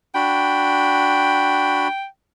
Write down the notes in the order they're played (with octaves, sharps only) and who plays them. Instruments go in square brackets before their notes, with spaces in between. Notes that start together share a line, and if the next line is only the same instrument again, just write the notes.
[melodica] D4 F#4 B5 [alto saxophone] G5